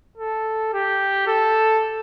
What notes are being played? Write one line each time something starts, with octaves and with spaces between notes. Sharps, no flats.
A4
G4
A4